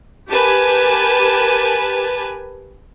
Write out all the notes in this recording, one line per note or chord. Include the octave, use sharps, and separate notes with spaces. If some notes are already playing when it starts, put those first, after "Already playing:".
G4 A#4 B4 G#5 A5